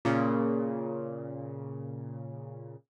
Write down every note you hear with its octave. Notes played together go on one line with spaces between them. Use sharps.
A#2 C#3